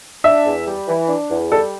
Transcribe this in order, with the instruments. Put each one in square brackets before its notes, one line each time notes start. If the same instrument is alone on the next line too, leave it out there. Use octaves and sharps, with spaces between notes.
[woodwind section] D4 [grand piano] E5
[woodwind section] E2
G3
E3
D4
E2
[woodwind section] G3 [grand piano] A4